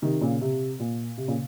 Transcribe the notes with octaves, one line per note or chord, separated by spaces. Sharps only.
C3 D#3
A#2 C#3
C3
A#2
C3
A#2 C#3